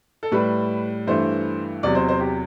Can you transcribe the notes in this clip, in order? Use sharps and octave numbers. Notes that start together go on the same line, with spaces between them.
A4
A2 G3 B4
G2 E3 A3 C5
E2 C3 F#3 D5
C5
C5
G4